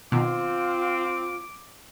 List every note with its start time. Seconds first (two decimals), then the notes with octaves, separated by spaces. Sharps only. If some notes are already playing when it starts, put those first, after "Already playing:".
0.12 B2 D#3 C4 F4 D6